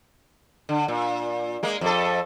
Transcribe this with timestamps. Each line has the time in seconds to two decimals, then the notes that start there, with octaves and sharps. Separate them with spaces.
0.69 D3
0.88 A#2
1.63 G#3 A#3
1.81 F2 A4